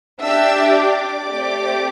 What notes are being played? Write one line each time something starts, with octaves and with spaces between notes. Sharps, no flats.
D4 G4 E5 E6
D5 D6
A3 C4 G4